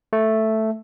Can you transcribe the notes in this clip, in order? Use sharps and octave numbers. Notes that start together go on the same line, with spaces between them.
A3